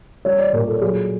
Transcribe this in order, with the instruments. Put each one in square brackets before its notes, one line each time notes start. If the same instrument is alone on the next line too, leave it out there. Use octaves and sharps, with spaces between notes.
[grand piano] G3 C#5
D5
A#2 A#4
A4
F#3 G#4